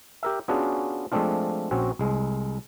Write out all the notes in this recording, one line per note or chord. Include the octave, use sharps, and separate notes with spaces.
G4 A#4 E5
B3 C#4 D4 F4 F#4 G#4
F3 G#3 A3 C4 D4 F4
A#1 C4 C#4 F#4 C#5
C2 G#3